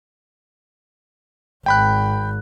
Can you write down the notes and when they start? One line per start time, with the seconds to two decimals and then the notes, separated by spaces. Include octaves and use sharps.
1.66 G#1 G5 B5 F#6